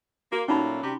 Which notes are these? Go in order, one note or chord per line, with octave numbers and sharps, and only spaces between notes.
A#3 F#4
A#2 F#3 A3 C#4 D#4 B5
C3 G3 G4